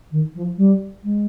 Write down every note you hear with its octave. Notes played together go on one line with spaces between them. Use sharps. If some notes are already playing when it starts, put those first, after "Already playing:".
D#3
F3
G3
G#3